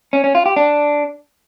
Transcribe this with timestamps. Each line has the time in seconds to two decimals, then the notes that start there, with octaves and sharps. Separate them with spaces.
0.13 C#4
0.24 C#4
0.35 F4
0.46 G4
0.56 D4